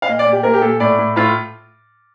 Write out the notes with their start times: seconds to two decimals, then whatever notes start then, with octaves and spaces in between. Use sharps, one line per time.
0.02 F5
0.07 A#2 D#5
0.19 D5
0.26 A#2
0.32 G4
0.43 A#2 A#4
0.54 G4
0.62 A#2 A4
0.80 A2 D5
0.99 A2
1.16 A2 F4